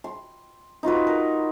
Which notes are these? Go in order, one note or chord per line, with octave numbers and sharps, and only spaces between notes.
C6
D#4 F4 F#4 B4
A#4